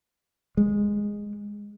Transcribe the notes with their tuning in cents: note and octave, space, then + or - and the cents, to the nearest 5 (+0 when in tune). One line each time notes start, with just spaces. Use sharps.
G#3 -10